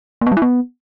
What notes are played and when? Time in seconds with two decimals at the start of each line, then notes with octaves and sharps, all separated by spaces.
0.21 A#3
0.27 B3
0.32 G3
0.37 E4
0.42 B3